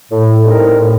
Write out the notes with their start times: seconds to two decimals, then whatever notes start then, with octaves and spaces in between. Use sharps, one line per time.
0.12 A2
0.45 G3 C4 D#4 A#4
0.79 A2